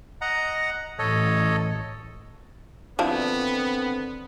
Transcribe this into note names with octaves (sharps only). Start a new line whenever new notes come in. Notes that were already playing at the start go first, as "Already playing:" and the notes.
D#5 F#5 A#5
A1 A4 C#5 D#5
D3 D#3 F3 B3 C4 D4 E4